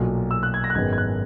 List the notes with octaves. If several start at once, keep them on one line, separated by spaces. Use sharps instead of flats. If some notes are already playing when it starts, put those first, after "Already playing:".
Already playing: B1 A#2 F#3
E6
F#6
G#6
A#6
F#6
G#1 F#2 D#3 G#3 B3 G#6
G#6
F#6